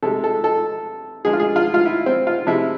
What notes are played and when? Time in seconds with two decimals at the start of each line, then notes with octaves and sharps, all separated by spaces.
0.03 C3 G#3 A4
0.24 A4
0.44 A4
1.25 D3 G#3 G#4
1.33 F4
1.40 G#4
1.56 F4
1.74 F4
1.85 E4
2.06 C4
2.27 F4
2.47 C3 F3 G#3 E4